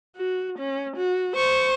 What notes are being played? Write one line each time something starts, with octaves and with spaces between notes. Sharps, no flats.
F#4
C#4
F#4
C5 C#6